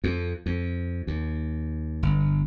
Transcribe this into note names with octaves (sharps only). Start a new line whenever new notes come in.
F2
F2
D#2
G1